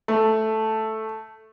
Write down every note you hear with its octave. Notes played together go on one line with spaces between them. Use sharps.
A3